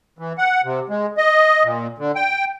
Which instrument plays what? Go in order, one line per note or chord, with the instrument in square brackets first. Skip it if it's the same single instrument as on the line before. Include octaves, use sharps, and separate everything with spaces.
[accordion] E3
F#5
C3
G#3
D#5
A#2
D3
G5